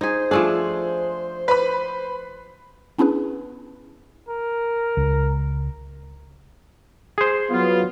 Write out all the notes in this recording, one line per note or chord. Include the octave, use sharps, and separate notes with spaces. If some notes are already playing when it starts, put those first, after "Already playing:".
D#4 G#4 C5
F3 A3 D4 G#4
B4 B5
B3 C#4 D4 E4 G#4 B4
A#4
C#2
G#4 C5
F#3 B3 F4